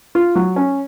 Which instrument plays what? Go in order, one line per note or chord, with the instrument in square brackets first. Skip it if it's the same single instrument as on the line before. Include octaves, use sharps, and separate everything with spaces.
[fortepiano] F4
F#3
C#4